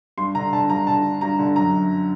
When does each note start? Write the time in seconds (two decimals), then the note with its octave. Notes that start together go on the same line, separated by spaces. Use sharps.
0.18 G2 C6
0.35 D3 A#5
0.53 D3 A5
0.69 G2 A#5
0.87 D3 A5
1.04 D3
1.21 G2 A#5
1.39 D3
1.56 F#2 A#5
1.74 F#2